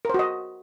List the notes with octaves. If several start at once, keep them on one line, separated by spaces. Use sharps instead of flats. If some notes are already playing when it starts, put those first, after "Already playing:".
F#4 A#4 C5 D#5